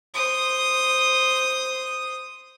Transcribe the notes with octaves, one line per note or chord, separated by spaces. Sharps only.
C5 D#6